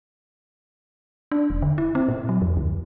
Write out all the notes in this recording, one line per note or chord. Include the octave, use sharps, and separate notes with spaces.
D4
E1
D3
E4
C4
A#2
F#3
F2
D2